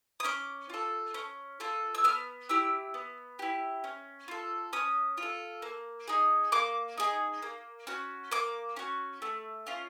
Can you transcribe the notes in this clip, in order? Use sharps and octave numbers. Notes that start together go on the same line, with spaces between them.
D#6
C#4 D6
F4 A4
C#4
F4 A4
E6
B3 F6
E4 G4 E6
B3
E4 G4
C#4
F4 A4
C#4 D#6
F4
A4
A#3
D#4 G#4
A#3 D6
D#4 G#4
A#3
C#4 F#4
A#3 D6
C#4 F#4
A3
C#4 F4